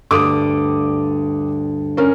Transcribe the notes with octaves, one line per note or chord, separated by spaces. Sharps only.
D2 G2 D3 D6 D#6
C#4 A#4